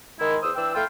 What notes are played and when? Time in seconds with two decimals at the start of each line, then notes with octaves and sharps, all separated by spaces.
0.20 D#3 G#3 E4
0.42 E2 C5 D#6 E6
0.56 E3 D4 G5 E6
0.74 A3 E4 F4 F5 G5